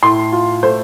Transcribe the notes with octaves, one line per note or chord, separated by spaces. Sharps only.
A2 C6
F4
A3 C5